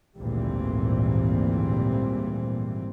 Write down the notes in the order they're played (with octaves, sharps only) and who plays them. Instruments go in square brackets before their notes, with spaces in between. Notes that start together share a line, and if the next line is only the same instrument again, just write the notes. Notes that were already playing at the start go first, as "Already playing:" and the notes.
[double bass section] G#1 D2 A#2 E3 G3 C4